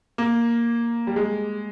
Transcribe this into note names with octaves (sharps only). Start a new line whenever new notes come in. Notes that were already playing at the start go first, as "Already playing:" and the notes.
A#3
G3
G#3